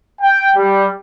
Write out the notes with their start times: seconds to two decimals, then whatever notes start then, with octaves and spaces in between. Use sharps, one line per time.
0.21 G5
0.54 G3